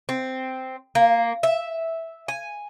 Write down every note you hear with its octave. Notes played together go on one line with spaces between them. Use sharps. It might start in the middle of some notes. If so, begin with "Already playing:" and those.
C4
A#3
E5
G#5